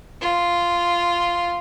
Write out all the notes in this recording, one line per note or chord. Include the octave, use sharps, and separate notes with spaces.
F4